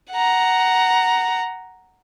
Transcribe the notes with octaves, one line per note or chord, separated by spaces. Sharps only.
F#5 A#5